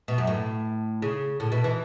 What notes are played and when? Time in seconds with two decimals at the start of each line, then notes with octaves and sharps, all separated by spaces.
0.08 B2
0.18 F#2
0.27 A2
1.02 C#3
1.40 A2
1.52 B2
1.64 E3